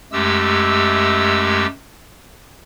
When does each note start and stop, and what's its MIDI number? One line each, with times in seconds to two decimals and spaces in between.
0.12 1.66 42
0.12 1.66 56
0.12 1.66 57
0.12 1.66 67
0.12 1.66 88